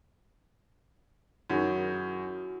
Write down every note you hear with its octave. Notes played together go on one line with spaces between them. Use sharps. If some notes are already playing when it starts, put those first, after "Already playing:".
F#2 D#3 E4 F#4 G#4